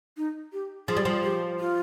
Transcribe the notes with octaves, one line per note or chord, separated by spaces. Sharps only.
D#4
G4
F3 G#4
G3
F3
G4
F4